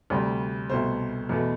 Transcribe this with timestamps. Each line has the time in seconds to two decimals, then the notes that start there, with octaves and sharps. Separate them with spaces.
0.10 D2 C3 G3
0.70 C2 B2 A3 C5
1.29 E2 B2 A3